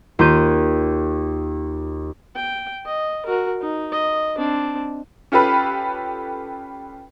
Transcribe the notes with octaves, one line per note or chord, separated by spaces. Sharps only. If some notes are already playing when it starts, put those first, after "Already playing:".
D#2 F4 G6 D#7
G5
D#5
F#4 A#4
D#4
D#5
C4 D4
C#4 F4 G4 A4 B4 B5